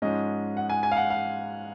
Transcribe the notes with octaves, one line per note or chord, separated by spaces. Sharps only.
G#2 F3 G#3 C#4 D#5
F#5
G#5
G#5
F5
F#5
F5